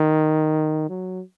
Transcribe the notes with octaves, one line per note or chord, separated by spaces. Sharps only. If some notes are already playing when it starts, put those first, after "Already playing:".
Already playing: D#3
F#3